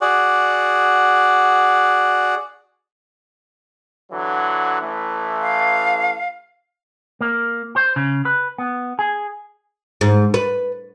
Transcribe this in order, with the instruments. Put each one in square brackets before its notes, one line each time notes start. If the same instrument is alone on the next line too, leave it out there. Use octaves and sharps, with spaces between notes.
[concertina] F#4 G#4 D5 F#5
[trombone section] D3 E3 F#3
A1 E3 A3
[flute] F5
[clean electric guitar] A#3
C5
C#3
B4
B3
G#4
[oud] G#2
B4